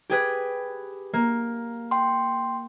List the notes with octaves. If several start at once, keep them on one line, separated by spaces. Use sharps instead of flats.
G4 G#4 B4
A#3
G5 C6